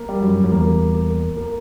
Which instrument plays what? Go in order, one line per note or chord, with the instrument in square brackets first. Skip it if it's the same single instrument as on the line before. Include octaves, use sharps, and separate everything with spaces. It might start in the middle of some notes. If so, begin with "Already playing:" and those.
Already playing: [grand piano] A#3
G3
[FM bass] F#2
F#2
[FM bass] E2 [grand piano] A#3
[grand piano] A#3
A#3